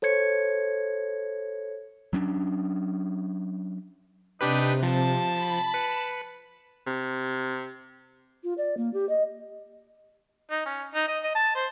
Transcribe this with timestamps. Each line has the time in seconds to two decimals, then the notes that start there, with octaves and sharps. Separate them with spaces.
0.02 A4 C5 C#5 G#6 C#7
2.13 F#3 C#4 D4
4.41 C3 D4 D#4 G4 B4
4.82 F3 A5
5.33 B5
5.74 B4 C#7
6.87 C3
8.43 F4
8.58 D5
8.77 A#3
8.93 G4
9.09 D#5
10.51 D#4
10.66 C#4
10.95 D#4
11.08 D#5
11.24 D#5
11.35 A5
11.56 C5